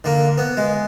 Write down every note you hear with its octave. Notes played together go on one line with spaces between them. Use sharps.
D3 A#3
B3
G#3